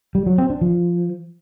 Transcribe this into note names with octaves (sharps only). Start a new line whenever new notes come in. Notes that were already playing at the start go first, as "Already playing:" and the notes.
G3
F#3
C4
D4
F3